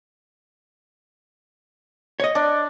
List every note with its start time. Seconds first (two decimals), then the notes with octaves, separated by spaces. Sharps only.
2.20 C#5 D#5
2.35 D4